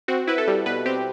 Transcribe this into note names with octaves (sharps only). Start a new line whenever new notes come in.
C4 F#4
E4 B4
A4
G3
B2 B4
C4 G4